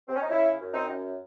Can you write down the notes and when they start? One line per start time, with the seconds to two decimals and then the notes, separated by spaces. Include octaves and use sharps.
0.08 C4
0.16 C#4
0.22 D#4
0.30 C#3 C#4 E4
0.59 F#2
0.74 C4 D#4
0.89 F#2